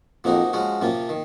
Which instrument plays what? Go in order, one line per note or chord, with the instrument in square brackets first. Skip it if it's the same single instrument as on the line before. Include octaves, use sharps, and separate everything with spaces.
[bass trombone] F2 [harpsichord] F3 A#3 D#4 F#4
[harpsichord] F3 G#3 C#4 F#4
[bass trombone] F#2 [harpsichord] C3 F3 A#3 F4
[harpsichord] D#3